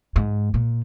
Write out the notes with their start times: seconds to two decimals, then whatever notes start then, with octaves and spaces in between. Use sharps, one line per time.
0.16 G#2
0.54 A#2